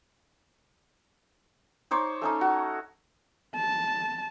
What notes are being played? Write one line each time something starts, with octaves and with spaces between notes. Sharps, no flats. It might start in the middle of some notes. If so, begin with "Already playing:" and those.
D#4 C5 C#5 D6
A3 C#4 D#4
F#4
A5